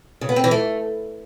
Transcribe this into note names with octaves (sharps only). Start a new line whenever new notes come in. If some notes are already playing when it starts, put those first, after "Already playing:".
C#3
B3
C4
E3
A3